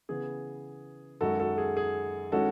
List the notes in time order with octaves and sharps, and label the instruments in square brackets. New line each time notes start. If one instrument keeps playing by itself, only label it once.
[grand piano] C#3 E3 B3 G#4
F#2 D#3 G#3 F#4 A4
F#4 A4
G#4
G#4
D#3 G#3 C#4 E4 F#4 A4